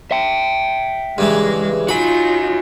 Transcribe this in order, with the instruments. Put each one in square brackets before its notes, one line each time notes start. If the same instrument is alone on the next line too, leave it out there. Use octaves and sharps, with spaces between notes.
[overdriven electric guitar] E5 G5
[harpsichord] G2 C#3 E3 [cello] G#3
[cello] D#4 F4 [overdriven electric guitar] F#4 G#5 [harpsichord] B5